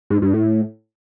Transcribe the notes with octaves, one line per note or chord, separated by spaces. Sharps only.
G#2
G2
A2